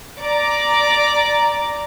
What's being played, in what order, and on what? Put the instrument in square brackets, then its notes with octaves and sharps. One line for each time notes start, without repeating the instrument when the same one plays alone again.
[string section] D5 A#5 D6